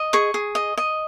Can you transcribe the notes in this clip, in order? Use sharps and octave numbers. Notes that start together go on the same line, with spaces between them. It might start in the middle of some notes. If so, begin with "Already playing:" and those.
Already playing: D#5
G#4 C#6
G#4
D#5
D#5